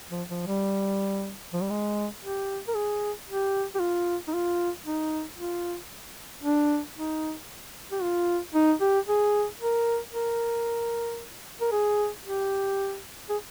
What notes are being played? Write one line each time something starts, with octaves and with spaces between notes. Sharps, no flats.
F3
F3
G3
F3
G3
G#3
G4
A#4
G#4
G4
G4
F4
D#4
F4
D#4
F4
D4
D#4
G4
F4
D#4
G4
G#4
A#4
A#4
A#4
G#4
G4
G#4